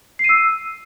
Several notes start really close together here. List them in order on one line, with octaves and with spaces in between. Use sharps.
C7 D#7 E6